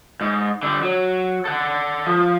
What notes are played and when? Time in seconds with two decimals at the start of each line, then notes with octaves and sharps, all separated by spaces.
0.21 G#2
0.63 D3 G3
0.83 F#3
1.45 A4 F#5
2.06 F3